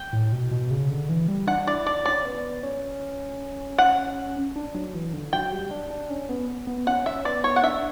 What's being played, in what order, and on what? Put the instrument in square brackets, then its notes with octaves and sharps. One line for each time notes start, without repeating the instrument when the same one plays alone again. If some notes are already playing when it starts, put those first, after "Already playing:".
Already playing: [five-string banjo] G5
[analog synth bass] A2
B2
B2
C#3
D3
E3
G3
[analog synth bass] D4 [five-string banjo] F#5
[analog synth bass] E4 [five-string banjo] D5
[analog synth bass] D4 [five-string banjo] D5
[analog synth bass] C#4 [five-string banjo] D5
[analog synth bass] B3
C#4
[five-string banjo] F#5
[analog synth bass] D4
F#3
E3
D3
[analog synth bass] F#3 [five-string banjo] G5
[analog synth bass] G3
D4
D4
C#4
B3
B3
[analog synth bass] C#4 [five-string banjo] F#5
[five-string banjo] E5
[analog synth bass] C#4
[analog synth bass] B3 [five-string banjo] D5
[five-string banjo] C#5
F#5
[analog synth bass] D4 [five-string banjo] E5